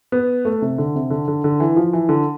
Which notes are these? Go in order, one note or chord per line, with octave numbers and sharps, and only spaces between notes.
B3
A3
C3
D3
C3
D3
D3
D3
E3
F3
E3
D3